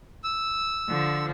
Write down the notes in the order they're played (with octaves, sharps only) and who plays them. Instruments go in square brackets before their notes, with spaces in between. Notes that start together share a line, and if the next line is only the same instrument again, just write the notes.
[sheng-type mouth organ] E6
[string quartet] D3 F3